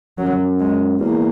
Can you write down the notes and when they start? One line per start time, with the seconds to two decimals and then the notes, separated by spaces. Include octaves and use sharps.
0.18 F#2 F#3
0.60 G#3
1.00 E2 A#3